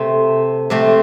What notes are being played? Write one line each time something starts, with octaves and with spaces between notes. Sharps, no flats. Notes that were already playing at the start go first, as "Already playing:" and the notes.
Already playing: C3 A3 C4
C3 A3 C4